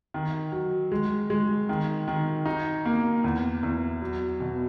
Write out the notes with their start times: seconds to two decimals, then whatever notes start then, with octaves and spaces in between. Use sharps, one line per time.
0.14 D#3
0.52 F#3
0.92 G#3
1.30 G#3
1.69 D#3
2.08 D#3
2.46 D#4
2.85 A#3
3.24 E2
3.63 E2
4.01 F#3
4.40 B2